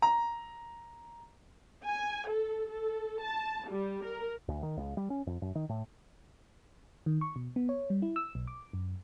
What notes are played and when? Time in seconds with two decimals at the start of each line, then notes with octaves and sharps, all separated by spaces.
0.02 A#5
1.85 G#5
2.29 A4
2.69 A4
3.21 A5
3.70 G3
4.04 A#4
4.48 D2
4.63 D#3
4.77 C#2
4.97 G3
5.10 C#4
5.27 F2
5.42 F#2
5.55 D#3
5.69 A2
7.06 D#3
7.21 C#6
7.36 B2
7.56 B3
7.69 C#5
7.90 G3
8.02 E4
8.16 E6
8.35 B1
8.47 D6
8.73 F#2